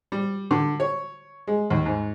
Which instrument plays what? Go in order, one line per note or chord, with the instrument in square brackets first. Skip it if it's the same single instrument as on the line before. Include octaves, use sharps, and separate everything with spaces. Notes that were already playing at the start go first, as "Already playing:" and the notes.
[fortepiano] G3
D3
C#5
G#3
D#2
G#2